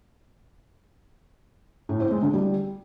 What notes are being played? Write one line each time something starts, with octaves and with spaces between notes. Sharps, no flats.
A2
C4
G#3
D3
G3